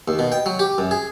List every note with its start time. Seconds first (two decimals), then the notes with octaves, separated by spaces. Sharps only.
0.08 D#2
0.19 B2
0.32 G5
0.46 F#3
0.59 G4
0.78 F#2
0.91 G#4